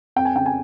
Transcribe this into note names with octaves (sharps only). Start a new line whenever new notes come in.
F2 G5
G#5
C#3 G5
G#5